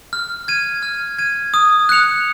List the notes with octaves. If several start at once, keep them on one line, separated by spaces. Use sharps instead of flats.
F6
G#6 D#7
F6
G#6 D#7
D#6
F#6 C#7 F7